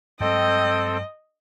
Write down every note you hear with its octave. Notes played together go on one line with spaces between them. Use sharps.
G2 F#3 G#3 C4 A4 D#5 G5